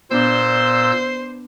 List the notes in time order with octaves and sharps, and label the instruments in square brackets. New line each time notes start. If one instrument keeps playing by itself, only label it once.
[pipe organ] A#2 E6 G6 [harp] B3 D4 [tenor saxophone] C5